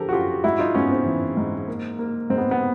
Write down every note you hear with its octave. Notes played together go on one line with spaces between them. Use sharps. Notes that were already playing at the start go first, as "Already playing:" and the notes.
Already playing: D3 F3 G4 A4 A#4
F#4
F#2 F4 G4
G#2 E4 F#4
D#4 F4
G#2 B3 C#4
C4
E3
G#2
A#3
A#3
G#2 C4
B3
B3